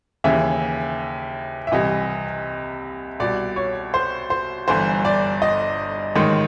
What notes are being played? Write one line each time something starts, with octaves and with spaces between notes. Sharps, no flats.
D#2 C#3 E3 E5
E5
C2 C3 E3 D#5
C2 B2 D5
C#5
C5
C5
G1 G2 E3 C5
D5
D#5
A1 G#2 D#3